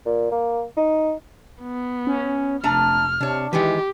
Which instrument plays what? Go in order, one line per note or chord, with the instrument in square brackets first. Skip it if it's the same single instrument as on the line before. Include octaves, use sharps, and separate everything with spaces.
[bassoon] A#2
A#3
D#4
[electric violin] B3
[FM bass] C#4
[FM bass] F1 [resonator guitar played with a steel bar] A3 D4 A#5 [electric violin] F6
[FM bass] C3 [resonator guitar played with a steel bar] D4 C#5
[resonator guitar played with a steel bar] D#3 G#3 B4 [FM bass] E3 [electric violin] G4